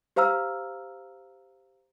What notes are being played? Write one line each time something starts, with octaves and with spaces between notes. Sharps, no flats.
G4 C5 F5 A#5 E6 F6